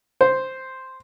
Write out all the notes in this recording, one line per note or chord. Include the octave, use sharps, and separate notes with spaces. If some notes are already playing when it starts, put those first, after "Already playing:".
C5